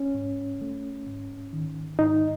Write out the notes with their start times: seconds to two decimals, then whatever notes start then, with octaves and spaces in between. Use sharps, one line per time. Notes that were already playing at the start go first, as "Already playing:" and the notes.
Already playing: C#4
0.14 G#2
0.61 A3
1.07 G#2
1.53 D#3
1.99 G#2 D#4